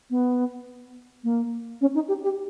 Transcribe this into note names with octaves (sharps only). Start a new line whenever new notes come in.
B3
A#3
C#4
D#4
G4
G4